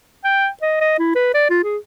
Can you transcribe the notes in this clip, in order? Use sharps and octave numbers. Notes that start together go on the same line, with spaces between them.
G5
D#5
D#5
E4
B4
D5
F4
G#4